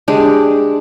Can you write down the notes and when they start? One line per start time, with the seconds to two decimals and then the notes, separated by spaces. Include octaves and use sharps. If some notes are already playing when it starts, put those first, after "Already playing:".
0.08 G#3 D4 G4